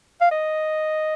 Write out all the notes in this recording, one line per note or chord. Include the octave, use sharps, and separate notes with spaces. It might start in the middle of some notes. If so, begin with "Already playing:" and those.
F5
D#5